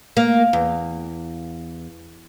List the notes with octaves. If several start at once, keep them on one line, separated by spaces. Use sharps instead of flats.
A#3
E2